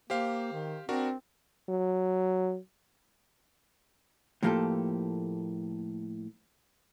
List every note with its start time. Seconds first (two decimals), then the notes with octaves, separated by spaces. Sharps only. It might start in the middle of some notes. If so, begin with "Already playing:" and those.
0.10 A#3 G4 C5 F5
0.53 D#3
0.89 C4 D4 F#4 A#4
1.69 F#3
4.43 A2 F3 A#3 F4 G4 A4